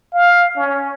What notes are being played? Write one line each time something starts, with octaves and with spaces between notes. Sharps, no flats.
F5
C#4